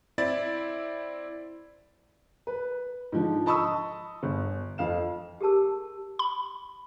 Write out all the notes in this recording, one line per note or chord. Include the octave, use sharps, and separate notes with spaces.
C4 E4 D5 A6
B4
G#2 D3 F3
D#5 A5 B5 C#6 D#6 E6
G1
F2 F5 E7
G4 G#4 A#4 A5 E6
B5